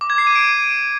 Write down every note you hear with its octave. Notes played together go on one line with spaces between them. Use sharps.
D6
G#6
C7
D#7
D7